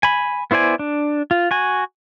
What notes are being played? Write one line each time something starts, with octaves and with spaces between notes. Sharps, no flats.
G#5 B5
B3 E4 C5 D5 G#5
D4
F4
F#4 G#5